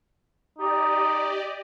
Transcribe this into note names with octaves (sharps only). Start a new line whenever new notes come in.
D#4 G4 D5 D#5